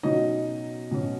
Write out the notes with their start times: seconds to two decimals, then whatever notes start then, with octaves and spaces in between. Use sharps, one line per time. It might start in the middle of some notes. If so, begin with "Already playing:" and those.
0.03 B2 F#3 C#4 D#4 D#5
0.91 B2 F#3 C#4